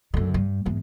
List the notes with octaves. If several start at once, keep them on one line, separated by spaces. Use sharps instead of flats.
F#2 D3
G2
E2 G#2